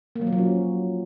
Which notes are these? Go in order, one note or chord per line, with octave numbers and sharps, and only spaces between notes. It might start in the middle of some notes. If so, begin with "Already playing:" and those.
A#3
F#3
F3
F#3
C#4